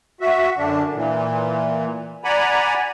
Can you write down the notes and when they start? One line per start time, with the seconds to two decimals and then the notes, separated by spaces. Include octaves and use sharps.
0.21 F#4 E5
0.57 F#2 D3 D4
0.94 A#2 E3
2.24 D5 F#5 G#5 A#5 B5